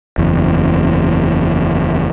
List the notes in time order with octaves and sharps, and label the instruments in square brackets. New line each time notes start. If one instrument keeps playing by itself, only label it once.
[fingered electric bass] F#1 E2